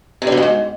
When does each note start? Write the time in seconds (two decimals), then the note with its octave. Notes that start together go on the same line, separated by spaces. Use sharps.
0.22 C3
0.27 D3
0.32 B2
0.37 G2
0.42 G#2